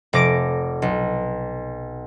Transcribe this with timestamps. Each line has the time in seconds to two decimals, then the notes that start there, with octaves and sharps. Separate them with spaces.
0.13 F1 D6 A#6 D7
0.82 B1